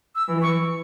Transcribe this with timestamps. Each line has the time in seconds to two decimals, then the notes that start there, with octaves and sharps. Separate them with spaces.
0.15 E6
0.28 E3
0.42 C#6